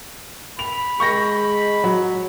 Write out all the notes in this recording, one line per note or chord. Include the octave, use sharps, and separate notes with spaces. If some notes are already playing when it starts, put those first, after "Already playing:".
B5 F7
G#3 C#6 G6 A#6
F#3